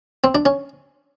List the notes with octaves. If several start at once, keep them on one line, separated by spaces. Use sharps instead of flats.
C4
D4
C#4